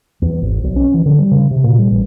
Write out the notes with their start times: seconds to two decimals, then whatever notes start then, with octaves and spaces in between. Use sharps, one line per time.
0.22 E2
0.41 G#1
0.64 B1
0.76 C#4
0.94 E3
1.05 D3
1.19 G3
1.31 C#3
1.51 C3
1.64 A#2
1.79 G3
1.91 A1